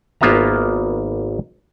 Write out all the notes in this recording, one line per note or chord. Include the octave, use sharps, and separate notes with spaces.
G#1 A#3 B3 F4 E5 A#5